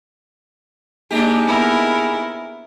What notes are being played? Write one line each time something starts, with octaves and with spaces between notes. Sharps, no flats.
G#2 G#3 A#3 D4 G4
B3 E4 A#4